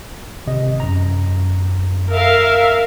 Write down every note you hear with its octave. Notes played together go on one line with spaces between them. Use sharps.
G#1 C3 D#5
F#2 A#5
A#4 E5 F5